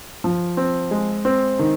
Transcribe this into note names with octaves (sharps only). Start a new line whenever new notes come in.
F3
C4
G#3
C4
D#3